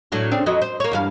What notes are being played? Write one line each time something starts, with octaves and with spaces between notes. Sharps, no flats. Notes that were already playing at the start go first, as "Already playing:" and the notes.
A2 F#3 D4
C#3 C4 D4
F2 F#3 D#5
C5
A#3 C#5
E2 G2 F5